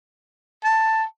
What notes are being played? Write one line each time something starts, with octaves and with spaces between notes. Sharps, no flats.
A5